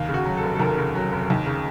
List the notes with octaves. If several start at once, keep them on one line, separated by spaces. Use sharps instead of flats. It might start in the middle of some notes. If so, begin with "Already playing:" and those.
Already playing: D#2 F5
C#3
F#4
F#3
A4
F1
A4
D#2 A#4
C#3
F#3
F1
D#2
C#3